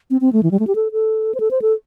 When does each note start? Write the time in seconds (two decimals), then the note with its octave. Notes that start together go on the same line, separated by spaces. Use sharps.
0.11 C4
0.21 C4
0.33 A3
0.43 E3
0.51 G3
0.59 A3
0.67 G4
0.75 A4
0.92 A4
1.35 C5
1.40 A4
1.51 C5
1.62 A4